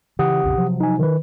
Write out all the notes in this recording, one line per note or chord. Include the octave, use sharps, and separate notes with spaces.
C#3 E3 G4 F#5 D#6
A#1 E2 C#3
C3 F3 F#3
D#4 G#5
D#3 B4